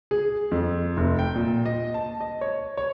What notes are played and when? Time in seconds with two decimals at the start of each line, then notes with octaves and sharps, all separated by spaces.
0.11 G#4
0.51 F2
0.97 F1
1.19 G5
1.35 A#2
1.66 D#5
1.94 A5
2.21 D#5
2.41 C#5
2.77 C#5